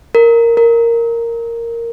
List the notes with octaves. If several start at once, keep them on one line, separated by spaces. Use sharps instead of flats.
A#4
A#4